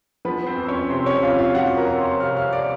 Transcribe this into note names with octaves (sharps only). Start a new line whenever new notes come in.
F3 B3 B4
C4 C5
F2
C#4 C#5
C3 C4 C5
C#4 C#5
F2 F4 F5
F4 F5
F3 F#4 F#5
A#4 A#5
F2
C5 C6
C3 F5 F6
F5 F6
D5 D6